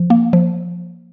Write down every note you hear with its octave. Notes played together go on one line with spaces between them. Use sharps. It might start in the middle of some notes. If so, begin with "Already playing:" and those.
Already playing: F3
A#3
F3